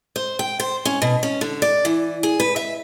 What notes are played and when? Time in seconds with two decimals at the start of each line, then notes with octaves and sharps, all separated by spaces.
0.16 C5
0.39 G5
0.60 C5
0.85 C#4
1.02 B2
1.23 C#4
1.41 D3
1.62 D5
1.85 E3
2.23 G#4
2.40 B4
2.56 E5